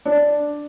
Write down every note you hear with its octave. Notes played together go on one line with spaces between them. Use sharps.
D4